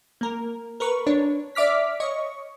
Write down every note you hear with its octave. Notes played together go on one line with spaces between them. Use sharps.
A#3 A#4
A#4 B4 C#6
D4 C#5
D5 E5 D6 F6 B6
C#5 D#5 C#6